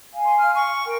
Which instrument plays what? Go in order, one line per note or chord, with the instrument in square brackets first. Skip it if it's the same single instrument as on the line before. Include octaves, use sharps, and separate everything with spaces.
[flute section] F5 G#5
[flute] C6
F6
C#6
[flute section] A#4 G5